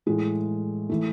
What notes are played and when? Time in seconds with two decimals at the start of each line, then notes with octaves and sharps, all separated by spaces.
0.06 A2 E3 G#3
0.89 E3 A3